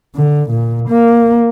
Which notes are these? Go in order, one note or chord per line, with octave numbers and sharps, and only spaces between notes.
D3
A#2
A#3